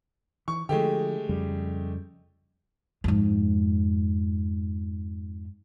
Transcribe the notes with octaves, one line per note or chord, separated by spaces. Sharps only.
E3 C#6
D3 F3 G#3 A3 G4
F2 C#3 G3
F2 G#2